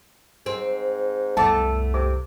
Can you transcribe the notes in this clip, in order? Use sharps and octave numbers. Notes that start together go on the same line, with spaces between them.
G#2 C4
C2 F#2 A3 B3 A4 A5 D6
C3 D6